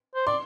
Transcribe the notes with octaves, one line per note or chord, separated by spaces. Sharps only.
C5
D5 C6